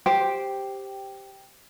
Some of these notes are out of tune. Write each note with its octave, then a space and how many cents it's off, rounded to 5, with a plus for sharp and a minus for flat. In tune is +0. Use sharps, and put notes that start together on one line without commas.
G4 +0 C5 +0 G5 -5